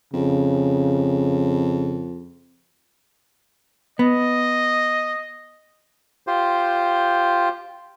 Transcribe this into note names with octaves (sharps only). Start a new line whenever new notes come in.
F2 C#3
B3 D#5
F4 G4 C5